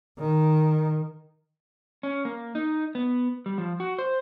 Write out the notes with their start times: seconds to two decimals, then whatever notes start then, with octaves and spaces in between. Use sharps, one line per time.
0.19 D#3
2.03 C#4
2.25 A#3
2.55 D#4
2.95 B3
3.46 G3
3.58 F3
3.80 F#4
3.99 C5